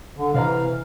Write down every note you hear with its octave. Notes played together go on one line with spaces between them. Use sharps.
D3
C3 E3 D5 F5 A#5